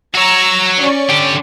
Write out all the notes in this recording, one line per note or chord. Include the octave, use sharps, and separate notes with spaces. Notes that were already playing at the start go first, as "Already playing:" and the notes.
F#4 C#5 A#5 E6 G#6
C#4 D5 C#6
D3 G4